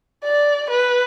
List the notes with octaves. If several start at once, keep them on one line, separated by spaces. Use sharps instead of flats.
D5
B4